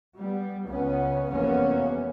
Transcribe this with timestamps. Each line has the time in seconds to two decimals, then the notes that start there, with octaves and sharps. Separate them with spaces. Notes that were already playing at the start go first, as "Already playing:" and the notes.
0.18 G3 B3
0.65 C#2 B3 C#4
1.29 F1 E2 A#3 B3 C#4